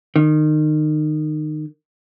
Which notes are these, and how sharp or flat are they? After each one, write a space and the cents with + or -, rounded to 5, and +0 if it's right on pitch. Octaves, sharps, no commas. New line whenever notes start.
D#3 -25